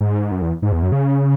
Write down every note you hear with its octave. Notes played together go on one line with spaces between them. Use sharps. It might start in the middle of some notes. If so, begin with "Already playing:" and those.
G#2
F#2
E2
G#2
E2
F#2
C#3